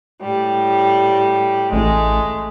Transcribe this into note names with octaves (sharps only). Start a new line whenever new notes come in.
A2 G3
A1 G#3 A3